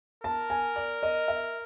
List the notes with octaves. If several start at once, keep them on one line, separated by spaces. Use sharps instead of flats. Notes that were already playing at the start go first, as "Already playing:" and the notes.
A#4 A5
G#5
D5
D#5
E5